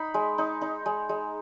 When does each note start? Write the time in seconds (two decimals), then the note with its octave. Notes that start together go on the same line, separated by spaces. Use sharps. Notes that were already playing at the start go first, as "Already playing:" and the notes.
Already playing: D#4 B5
0.14 G#3
0.38 D#4
0.61 D#4
0.86 G#3
1.09 G#3